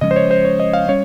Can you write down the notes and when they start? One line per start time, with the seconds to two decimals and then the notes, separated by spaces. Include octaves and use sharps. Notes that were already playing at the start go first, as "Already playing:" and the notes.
0.01 C#3 F3 G#3 C#4 D#5
0.11 C5
0.16 C#5
0.31 C5
0.45 C#5
0.60 D#5
0.73 F5
0.88 G3 C#4 C#5